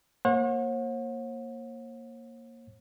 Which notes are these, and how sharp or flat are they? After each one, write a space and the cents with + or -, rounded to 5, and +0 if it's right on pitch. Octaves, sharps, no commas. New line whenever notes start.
A#3 +0 C#5 -45 F#5 -35